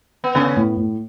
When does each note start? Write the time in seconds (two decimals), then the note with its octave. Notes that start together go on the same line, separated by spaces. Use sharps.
0.24 B3
0.35 C#3 B3 C#4
0.56 A2
0.77 A2